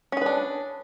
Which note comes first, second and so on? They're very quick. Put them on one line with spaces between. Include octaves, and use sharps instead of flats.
C#4 G#4 B4 D4